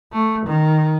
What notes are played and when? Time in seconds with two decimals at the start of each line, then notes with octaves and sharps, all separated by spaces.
0.12 A3
0.46 D#3